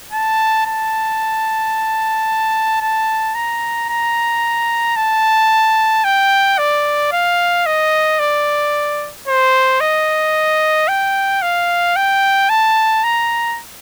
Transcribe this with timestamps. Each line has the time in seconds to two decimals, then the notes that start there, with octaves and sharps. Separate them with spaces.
0.12 A5
0.66 A5
2.81 A5
3.35 A#5
3.89 A#5
4.97 A5
6.04 G5
6.59 D5
7.12 F5
7.66 D#5
8.19 D5
9.28 C5
9.81 D#5
10.88 G5
11.42 F5
11.96 G5
12.50 A5
13.04 A#5